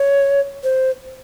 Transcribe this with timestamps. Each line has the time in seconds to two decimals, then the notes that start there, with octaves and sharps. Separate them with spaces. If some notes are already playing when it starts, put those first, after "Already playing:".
Already playing: C#5
0.64 C5